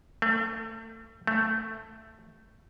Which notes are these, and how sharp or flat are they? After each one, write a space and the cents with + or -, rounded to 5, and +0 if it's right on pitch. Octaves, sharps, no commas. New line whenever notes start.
A3 +30
A3 +5